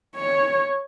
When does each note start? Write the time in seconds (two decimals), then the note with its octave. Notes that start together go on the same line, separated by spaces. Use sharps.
0.16 C#5